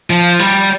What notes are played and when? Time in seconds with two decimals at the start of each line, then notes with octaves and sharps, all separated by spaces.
0.10 F3
0.39 G3